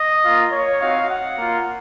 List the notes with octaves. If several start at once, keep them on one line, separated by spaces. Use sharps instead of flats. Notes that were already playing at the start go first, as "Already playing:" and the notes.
Already playing: D#5
A#3 F4
C#5
C4 D#4 F#4 F5
F#5
A#3 F4